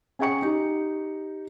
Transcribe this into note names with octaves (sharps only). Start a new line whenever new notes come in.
C#4 G#4 F#5 G5 C#6 C#7
D#4 G4